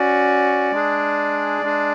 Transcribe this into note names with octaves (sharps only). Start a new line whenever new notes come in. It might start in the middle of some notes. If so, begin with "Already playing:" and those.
Already playing: C#4 F#4 D5
G#3 D4 G#4
G#3 D4 G#4